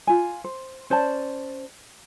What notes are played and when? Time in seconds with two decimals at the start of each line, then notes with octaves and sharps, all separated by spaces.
0.07 F4 G#5
0.44 C5
0.90 C#4 C5 D5 A5